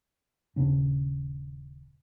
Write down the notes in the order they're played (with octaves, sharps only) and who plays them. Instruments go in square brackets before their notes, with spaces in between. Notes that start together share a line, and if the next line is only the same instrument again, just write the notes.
[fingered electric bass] D#1 C#3 C#4 D4